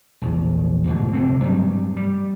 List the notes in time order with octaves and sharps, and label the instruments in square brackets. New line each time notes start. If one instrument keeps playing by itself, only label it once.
[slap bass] A#1 E2
D2 G#2 B2 D3
F1 D3 C4
G2 F#3 G3
G3